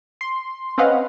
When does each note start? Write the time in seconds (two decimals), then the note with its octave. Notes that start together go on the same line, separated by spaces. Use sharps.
0.21 C6
0.78 C4 C#4 B4 D#5 F5 F#5